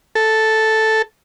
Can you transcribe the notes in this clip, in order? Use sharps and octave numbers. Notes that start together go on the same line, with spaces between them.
A4